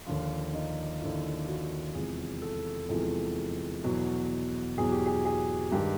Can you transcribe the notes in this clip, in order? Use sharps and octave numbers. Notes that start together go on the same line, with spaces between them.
D#2 D3 F3 F4
D#4
D#2 D3 F3 E4
F#4
E2 C3 F3 G#3 G#4
A4
E2 C3 F3 G#3 A4
E2 B2 F#3
E2 B2 F#3 G#4
G4
G#4
G#4
G2 D#3 G#3 G4